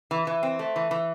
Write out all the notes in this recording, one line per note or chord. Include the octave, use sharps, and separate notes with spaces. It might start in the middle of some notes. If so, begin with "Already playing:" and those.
E3
E3
C4
A3
E3
E3